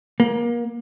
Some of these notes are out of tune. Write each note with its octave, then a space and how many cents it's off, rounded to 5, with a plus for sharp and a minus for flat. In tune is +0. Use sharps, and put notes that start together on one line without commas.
A#3 +30